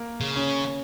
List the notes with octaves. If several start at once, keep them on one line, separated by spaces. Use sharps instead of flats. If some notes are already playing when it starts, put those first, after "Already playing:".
Already playing: A#3
C#3
C#4